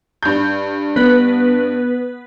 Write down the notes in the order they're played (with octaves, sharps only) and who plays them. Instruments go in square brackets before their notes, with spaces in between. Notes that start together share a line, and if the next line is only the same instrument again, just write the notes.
[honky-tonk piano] G2 G6
[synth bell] B3 B4